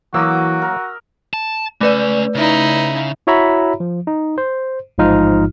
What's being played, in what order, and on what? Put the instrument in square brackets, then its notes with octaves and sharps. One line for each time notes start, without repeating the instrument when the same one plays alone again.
[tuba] E3 [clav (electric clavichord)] F#3 A#3 [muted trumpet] F#4 [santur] D#5 D6 E6
[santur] A#4
[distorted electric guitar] A5
[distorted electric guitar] C#2 C#4 [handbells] A3 B4 D5
[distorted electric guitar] C#3 [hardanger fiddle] D#4 E4
[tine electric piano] E4 F#4 C#5 E5 A#5 B5
F3
D#4
C5
A1 G#2 F3 D#4 F4 F6